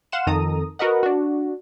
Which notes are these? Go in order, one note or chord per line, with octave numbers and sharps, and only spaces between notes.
F5 F#5 C6 E7
F2 D#3 A4 A#5 D#6
F#4 A#4 B4 D#5 F#5
D4 F#4